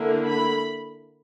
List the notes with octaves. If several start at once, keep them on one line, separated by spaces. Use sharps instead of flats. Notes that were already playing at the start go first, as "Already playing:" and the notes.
Already playing: D3 A#3 E4
B5